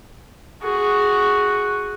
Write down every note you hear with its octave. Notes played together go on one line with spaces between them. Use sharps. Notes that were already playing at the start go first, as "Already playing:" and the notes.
F#4 G#4